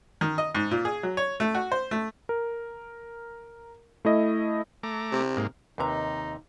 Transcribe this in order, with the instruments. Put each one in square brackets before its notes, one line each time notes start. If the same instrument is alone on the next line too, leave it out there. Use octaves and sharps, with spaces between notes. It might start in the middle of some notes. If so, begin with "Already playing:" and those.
[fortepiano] D#3
D#5
G#2
A#2
G#4
F#3
C#5
A3
F#4
C5
A3
[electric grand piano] A#4
A3 E4 D#5
[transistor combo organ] A3 A#5 D6
[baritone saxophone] C3
[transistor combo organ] G#2 A#3
[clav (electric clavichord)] D#2 C3 [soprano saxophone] D#4 [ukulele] B4 A#5